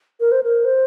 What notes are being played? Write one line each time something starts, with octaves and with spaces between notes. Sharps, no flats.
A#4
C5
A#4
C5